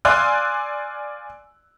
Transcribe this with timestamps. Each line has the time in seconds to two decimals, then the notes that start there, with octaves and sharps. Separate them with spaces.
0.05 D5 F5 G#5 C6 E6 F#6